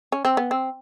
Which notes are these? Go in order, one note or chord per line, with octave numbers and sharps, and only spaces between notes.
C#4
C4
B3
C4